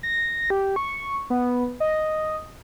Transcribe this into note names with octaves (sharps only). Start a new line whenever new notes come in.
A#6
G4
C#6
B3
D#5